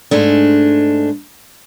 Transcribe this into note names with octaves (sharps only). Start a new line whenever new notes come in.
G#2 G#3 A3 D4